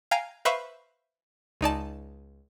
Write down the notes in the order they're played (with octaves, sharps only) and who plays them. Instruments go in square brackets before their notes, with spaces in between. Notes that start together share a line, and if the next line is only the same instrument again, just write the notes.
[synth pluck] F5 G5 G#5 A#5
B4 C5 E5 F5 B5 C#6
C#2 D#4 D5 A5